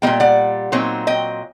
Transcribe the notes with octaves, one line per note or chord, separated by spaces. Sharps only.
A#2 G3 A#3 D#5 G5
D5 F#5
A#2 F#3 C4 D#4
D#5 G5